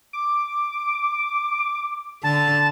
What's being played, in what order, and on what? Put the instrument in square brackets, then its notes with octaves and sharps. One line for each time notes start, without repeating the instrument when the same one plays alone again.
[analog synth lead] D6
[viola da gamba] D3 [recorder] A5